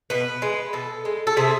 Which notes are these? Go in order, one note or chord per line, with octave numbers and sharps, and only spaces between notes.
B2 B4
G#3
B2 A4
G#3
A4
C3 G#4